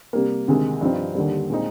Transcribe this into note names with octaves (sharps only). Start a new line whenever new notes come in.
C3 G3 A#3
D2 C3 D#3 G#3
G2 F3 C4 D#4
D#2 D3 G3
A#2 G#3 C4 D#4